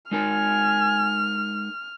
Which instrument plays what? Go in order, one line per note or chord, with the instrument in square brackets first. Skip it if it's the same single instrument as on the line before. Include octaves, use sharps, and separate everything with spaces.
[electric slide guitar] G#3 D#4 A#4 [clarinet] G#5 [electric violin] F6